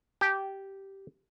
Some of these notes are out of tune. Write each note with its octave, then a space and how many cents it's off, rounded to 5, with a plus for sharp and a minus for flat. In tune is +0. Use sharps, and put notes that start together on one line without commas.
G4 -10 A5 -40